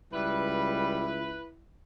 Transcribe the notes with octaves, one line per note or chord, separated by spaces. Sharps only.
C#2 G3 E4 B4